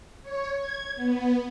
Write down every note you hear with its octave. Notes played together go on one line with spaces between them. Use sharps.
C#5
G#6
B3